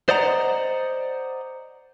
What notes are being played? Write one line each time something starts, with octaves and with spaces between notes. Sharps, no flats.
C5 D5 D#5 F#5 A#5